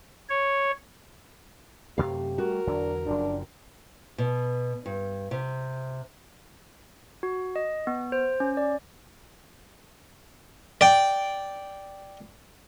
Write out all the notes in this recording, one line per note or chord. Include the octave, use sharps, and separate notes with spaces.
C#5
F#2 C3 A3 G4 F5
G3 A3 F#4 A#4
E2 D3 F#3 D4
F#1 F#2 F3 D4
B2
G2
C3
F#4
D#5
B3
C5
C#4
D5
D5 G5